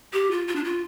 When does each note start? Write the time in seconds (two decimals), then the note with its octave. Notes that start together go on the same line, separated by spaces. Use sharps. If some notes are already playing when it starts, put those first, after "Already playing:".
0.13 G4
0.31 F4
0.48 F4
0.56 D4
0.64 F4